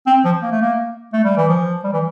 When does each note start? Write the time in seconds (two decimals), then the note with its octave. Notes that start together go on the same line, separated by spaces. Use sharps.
0.06 C4
0.25 F3
0.42 A#3
0.51 A3
0.61 A#3
1.13 A3
1.24 G3
1.37 E3
1.48 F3
1.84 G3
1.93 E3